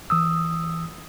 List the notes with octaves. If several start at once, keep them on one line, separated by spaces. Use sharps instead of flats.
E3 D#6 E6